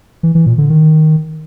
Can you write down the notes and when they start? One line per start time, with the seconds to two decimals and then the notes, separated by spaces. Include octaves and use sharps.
0.23 E3
0.35 E3
0.46 A#2
0.58 D3
0.70 D#3